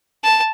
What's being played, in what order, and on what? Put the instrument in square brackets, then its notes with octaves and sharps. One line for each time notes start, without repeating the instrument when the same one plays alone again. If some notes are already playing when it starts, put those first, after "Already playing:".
[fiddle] A5